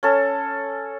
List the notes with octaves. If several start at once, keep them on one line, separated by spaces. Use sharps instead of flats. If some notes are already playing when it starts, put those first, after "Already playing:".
C#4 A4